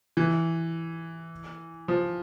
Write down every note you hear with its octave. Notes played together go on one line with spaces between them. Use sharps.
E3
F3